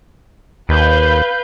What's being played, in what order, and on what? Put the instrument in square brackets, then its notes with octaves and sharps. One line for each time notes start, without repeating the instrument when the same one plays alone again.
[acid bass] D#2 [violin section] B4 F5 G6